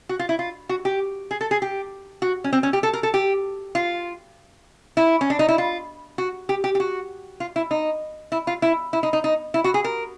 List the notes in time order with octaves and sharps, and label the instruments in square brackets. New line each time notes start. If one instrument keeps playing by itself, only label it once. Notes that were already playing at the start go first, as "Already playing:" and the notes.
[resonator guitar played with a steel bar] F#4
F4
E4
F4
F#4
G4
G#4
A4
G#4
G4
F#4
C#4
C4
C#4
G4
A4
A#4
A4
G4
F4
E4
C#4
D4
D#4
E4
F4
F#4
G4
G4
G4
F#4
F4
E4
D#4
E4
F4
E4
E4
D#4
D#4
D#4
E4
F#4
G#4
A#4